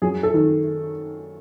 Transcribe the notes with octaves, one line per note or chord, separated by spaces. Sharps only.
F#2 G#4
A4
D#3